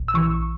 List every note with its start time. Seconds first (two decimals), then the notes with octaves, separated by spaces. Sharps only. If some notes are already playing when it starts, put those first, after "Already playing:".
Already playing: A#1
0.08 E6
0.14 E3 C#6